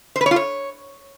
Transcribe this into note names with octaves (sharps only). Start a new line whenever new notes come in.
C5
B4
C#5
F4
C#5